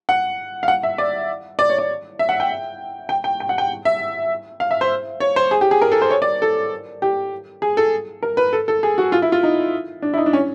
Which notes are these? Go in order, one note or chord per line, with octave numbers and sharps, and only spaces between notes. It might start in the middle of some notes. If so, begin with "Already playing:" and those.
F#5
F5
F#5
E5
D5
D5
C#5
D5
E5
F#5
G5
G5
G5
G5
F#5
G5
E5
F5
E5
C5
C#5
C5
G#4
G4
G#4
A#4
A4
C5
C#5
D5
A4
G4
G#4
A4
A#4
B4
A4
A4
G#4
F#4
F4
E4
F4
D#4
D4
E4
D#4
D4
C#4